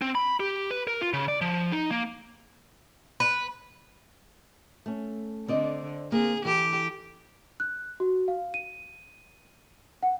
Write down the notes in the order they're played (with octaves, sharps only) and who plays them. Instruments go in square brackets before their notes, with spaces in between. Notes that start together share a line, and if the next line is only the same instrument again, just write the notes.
[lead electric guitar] C4
B5
G4
B4
A#4
F4
C#3
D5
F3
D#4
A#3
[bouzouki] B4
[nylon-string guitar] A3 C#4
[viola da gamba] D3 [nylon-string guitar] C4 D5 D#5
[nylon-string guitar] A#3 C4 [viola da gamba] G#4
[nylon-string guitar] E3 A4 [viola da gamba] G4
[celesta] F#6
F#4
F5
D#7
F#5